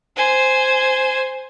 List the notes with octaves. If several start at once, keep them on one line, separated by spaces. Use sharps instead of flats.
C5 G#5